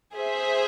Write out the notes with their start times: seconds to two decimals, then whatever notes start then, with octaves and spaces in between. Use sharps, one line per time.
0.15 G#4 C5 E5